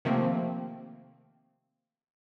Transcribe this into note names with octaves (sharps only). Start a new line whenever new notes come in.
C3 D#3 F3 A3 A#3 C4